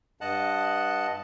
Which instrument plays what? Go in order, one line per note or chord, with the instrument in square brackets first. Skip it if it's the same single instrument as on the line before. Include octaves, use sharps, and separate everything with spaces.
[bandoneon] G2 D#5 F#5 A5 F#6